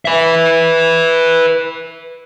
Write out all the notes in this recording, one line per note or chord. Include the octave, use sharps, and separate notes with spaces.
B4 E5